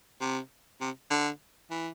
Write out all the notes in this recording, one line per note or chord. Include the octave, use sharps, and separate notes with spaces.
C3
C3
D3
E3